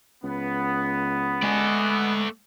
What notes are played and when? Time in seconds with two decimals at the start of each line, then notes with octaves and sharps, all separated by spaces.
0.24 C#2 B3
1.43 G#3 A3 D5 D#5 G#5